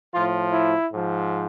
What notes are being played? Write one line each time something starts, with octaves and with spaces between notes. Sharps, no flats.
A2 F3 F4
E4
G#2
F3